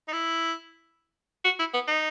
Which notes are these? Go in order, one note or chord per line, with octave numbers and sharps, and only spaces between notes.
D#4
E4
F#4
E4
B3
D#4